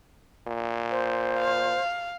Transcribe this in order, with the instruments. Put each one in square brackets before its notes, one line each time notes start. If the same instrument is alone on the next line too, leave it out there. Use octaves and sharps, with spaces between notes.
[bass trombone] A#2
[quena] C5
[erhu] F5